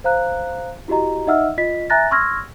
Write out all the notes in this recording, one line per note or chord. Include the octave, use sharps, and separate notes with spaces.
C5 F5 A#5 F#6
E4 F#4 G4 D#5 A#5
D#4 D#5 E5 F#5 E6 F6
F4 D#5 B6
E5 G#5 A#5 F#6 A6 A#6
C6 C#6 E6 F6 G#6 A#6